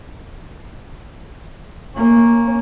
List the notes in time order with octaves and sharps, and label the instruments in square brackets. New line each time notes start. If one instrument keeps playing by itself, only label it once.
[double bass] A#3 C#4